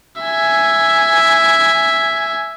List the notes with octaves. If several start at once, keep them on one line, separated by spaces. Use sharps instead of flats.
E5 G#5